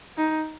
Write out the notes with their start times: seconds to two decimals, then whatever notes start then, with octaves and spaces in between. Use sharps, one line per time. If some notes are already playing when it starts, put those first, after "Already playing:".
0.17 D#4